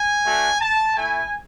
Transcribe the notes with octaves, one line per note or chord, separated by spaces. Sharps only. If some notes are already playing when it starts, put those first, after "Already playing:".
Already playing: G#5
A3 D4 F#4
A5
A3 E4 G#5